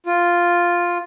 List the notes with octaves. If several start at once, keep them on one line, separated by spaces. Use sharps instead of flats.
F4